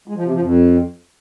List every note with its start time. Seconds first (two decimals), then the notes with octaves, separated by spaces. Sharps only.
0.08 G#3
0.16 F3
0.24 C3
0.32 F3
0.41 F2